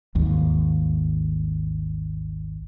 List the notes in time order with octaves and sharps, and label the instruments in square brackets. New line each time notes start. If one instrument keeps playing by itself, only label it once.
[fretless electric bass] G#1 D#2